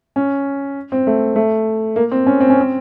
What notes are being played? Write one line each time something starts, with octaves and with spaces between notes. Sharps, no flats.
C#4
C4
A3
A3
A#3
C4
C#4
C4
C#4
C4